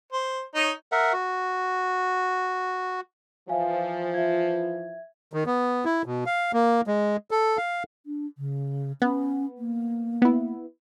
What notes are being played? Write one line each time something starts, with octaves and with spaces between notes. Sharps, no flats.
C5
D#4 C#5
A#4 E5 F#5
F#4
E3 F3 E5 F5 G#5
F4 E5 G#6
D#3
B3
E4
B2
F5
A#3
G#3
A4
F5
D4
C#3
B3 C#4
A#3
B3 E4